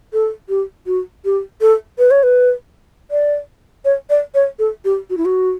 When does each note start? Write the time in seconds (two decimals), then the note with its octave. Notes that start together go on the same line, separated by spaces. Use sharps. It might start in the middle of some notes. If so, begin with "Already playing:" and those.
0.13 A4
0.49 G4
0.86 F#4
1.25 G4
1.61 A4
1.99 B4
2.11 C#5
2.23 B4
3.11 D5
3.85 C#5
4.10 D5
4.35 C#5
4.59 A4
4.85 G4
5.10 F#4
5.17 E4
5.25 F#4